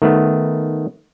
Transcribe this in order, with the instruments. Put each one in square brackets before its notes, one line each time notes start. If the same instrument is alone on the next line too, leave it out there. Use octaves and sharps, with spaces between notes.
[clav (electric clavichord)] D#3 A3 B3